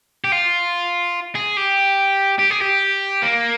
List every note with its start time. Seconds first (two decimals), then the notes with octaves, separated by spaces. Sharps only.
0.24 G4
0.32 F4
1.35 G#4
1.57 G4
2.39 G4
2.50 G#4
2.61 G4
3.23 A#3